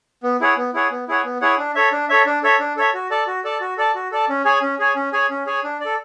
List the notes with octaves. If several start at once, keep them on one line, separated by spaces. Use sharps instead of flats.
B3
E4 G#4 C#5 F#5
B3
E4 G#4 C#5 F#5
B3
E4 G#4 C#5 F#5
B3
E4 G#4 C#5 F#5
D4
A4 C#5 E5
D4
A4 C#5 E5
D4
A4 C#5 E5
D4
A4 C#5 E5
F#4
A4 D5 A5
F#4
A4 D5 A5
F#4
A4 D5 A5
F#4
A4 D5 A5
C#4
G#4 C#5 G#5
C#4
G#4 C#5 G#5
C#4
G#4 C#5 G#5
C#4
G#4 C#5 G#5
D4
D5
A4